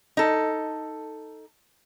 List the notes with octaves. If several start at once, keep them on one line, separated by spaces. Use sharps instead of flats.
D#4 A4